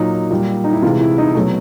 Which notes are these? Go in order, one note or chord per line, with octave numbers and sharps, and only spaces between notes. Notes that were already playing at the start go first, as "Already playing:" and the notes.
Already playing: A#2 F#3 D#4
A#2 G3
D#4
E4
C3 E3 G#3 F4
E4
D#4
B2 F#3 A3